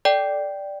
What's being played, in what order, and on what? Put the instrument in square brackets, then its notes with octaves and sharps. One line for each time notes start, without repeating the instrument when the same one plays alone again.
[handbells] A4 D5 G5